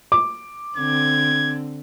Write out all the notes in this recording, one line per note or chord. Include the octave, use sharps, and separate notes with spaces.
D6
D3 C4 G#6